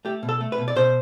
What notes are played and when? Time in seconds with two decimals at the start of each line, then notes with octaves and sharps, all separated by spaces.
0.05 A3 G4
0.23 B2
0.29 A4
0.41 A3
0.52 B4
0.58 B2
0.68 D5
0.76 B2 C5